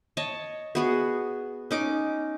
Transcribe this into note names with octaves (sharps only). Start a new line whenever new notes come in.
C#5 D#5 A5
B3 F#4 G#4
C#4 D#4 D6